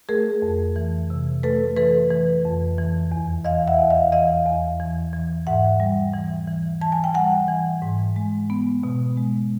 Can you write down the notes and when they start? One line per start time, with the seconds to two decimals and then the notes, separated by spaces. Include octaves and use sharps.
0.09 A3 G#4 A#4
0.42 F2
0.76 E3
1.10 C3
1.43 A3 A4 B4
1.76 E3 A4 B4
2.11 E3
2.45 F2
2.78 E3
3.12 E2
3.44 E3 D#5 F5
3.68 E5 F#5
3.79 E2
3.90 D#5 F5
4.12 E3 D#5 F5
4.46 E2
4.80 E3
5.13 E3
5.47 G#2 E5 F#5
5.80 G3
6.14 E3
6.48 E3
6.81 E3 A5
6.92 G#5
7.04 G5
7.14 G3 F#5 G#5
7.48 E3
7.82 G#2
8.16 G#3
8.50 B3
8.83 B2
9.17 G#3